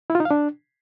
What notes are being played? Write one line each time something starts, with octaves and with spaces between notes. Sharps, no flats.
E4
F4
D#4
F5
D4